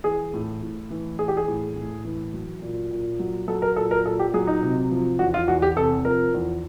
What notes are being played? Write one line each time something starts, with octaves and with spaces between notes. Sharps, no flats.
E3 G#4
A2
A2
E3
E3 G#4
G4
G#4
A2
A2
E3
F#3
A#2
A#2
F#3
F#3 A4
A#4
A#2 A4
A#4
A#2 A4
G4
F#3 G#4
D#4
C3
F3
E2 F#4
F4
E2 F#4
G4
C3 A4
F3 A#4
E2